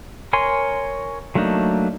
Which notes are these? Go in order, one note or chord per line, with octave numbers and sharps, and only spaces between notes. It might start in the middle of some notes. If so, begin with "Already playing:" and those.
A#4 C#5 G#5 C6
F#3 A3 A#3 D4 D#4